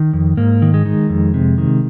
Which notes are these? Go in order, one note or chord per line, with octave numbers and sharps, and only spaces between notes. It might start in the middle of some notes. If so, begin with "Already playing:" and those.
Already playing: D#3
F2
G#2 A#3
D#3
G#3
D#3
F2
C3
D#3